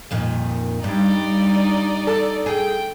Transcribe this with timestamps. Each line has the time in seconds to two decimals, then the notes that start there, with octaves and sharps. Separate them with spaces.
0.11 F2 A#2 D#3
0.84 G2 D#4 D5
2.07 A4
2.46 G#4 G5